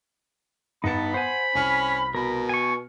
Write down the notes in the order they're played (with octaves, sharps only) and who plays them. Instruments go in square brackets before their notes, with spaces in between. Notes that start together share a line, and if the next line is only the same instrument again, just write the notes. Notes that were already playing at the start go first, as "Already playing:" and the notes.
[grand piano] G2 C#7 [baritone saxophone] B3 [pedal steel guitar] D#4 A5 [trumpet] B5
[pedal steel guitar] C5 G#5 [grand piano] F#5
[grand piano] C2 F6 [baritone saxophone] C#4
[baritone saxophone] B2 [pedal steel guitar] A#4
[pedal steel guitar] G#5 C#6